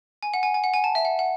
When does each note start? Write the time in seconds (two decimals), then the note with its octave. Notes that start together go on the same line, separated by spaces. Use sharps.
0.23 G#5
0.34 F#5
0.43 G#5
0.54 G#5
0.64 F#5
0.74 G#5
0.84 A5
0.95 E5
1.05 F#5
1.19 F#5